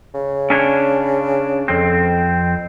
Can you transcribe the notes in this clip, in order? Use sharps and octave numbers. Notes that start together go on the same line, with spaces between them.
C#3
C#4 D4 C#5
F2 C4